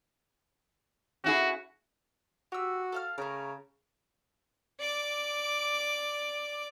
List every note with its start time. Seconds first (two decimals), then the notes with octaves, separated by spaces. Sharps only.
1.24 C#4 E4 F#4 G#4
2.52 F#4 G4 E6
2.92 A4 F5 F6
3.18 C#3 A3 A#4
4.80 D5 D6